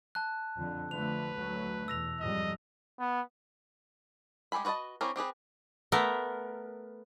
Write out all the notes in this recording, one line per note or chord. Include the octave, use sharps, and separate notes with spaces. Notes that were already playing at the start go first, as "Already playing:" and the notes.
A5 F#6
F2 D3
D3 F3 A3 B4 F7
D2 F#3 A3
E2 B2 E6 A#6 F7
F2 G#2 G3 D#5
B3
G#3 G4 A4 G#5 B5
F#4 B4 C#5 D#5 A5
C4 C#4 E4 G4 A#4
C4 G4 G#4 B4
A3 B3 A#4